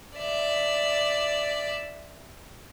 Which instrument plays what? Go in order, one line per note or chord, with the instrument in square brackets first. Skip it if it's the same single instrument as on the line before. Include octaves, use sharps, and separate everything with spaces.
[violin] D5 E5